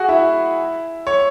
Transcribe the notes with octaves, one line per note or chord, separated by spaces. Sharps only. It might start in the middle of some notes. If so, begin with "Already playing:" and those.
Already playing: F#4 G#4 F#5 G#5
E4 E5
C#5